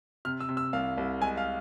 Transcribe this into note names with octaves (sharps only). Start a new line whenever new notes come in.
C3 F6
E6
C3
E6
C2 F5
C2
G#3 G#5
F5